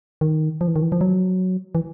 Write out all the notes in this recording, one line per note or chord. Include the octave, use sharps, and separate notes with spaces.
D#3
F3
E3
D#3
E3
F3
F#3
E3